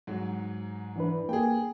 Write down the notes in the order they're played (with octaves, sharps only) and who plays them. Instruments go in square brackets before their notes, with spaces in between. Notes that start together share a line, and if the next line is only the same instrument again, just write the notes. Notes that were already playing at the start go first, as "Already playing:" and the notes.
[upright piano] G#2 F#3
[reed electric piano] E3 D4 B4
[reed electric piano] A#3 [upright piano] G#4 G5